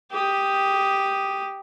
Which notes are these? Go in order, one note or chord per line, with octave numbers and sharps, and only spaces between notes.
G4 D#6